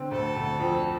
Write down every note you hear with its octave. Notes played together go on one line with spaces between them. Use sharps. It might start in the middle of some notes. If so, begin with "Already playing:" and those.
Already playing: D3 C4
D2 A4
D2
F2